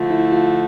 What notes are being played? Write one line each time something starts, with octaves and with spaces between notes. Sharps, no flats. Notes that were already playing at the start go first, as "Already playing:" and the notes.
Already playing: D3 F3 A3 F4
E4
F4